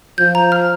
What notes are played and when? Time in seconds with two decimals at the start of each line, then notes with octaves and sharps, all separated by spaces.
0.18 F3 G6
0.35 A#5
0.52 F6